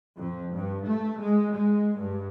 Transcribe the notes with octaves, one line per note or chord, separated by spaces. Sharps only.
F2
G2
A3
G#3
G#3
G2